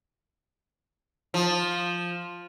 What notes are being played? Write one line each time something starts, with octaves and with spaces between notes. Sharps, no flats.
F3